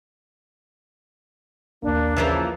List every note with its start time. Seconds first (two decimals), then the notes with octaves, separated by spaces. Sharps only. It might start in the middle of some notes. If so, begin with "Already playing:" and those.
1.83 A#1 D#2 A#3 D4
2.17 C#3 E3 F3 A#3